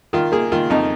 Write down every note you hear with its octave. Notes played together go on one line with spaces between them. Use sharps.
D#3 F4
A#3 G#4
D#3 F4
F2 D#4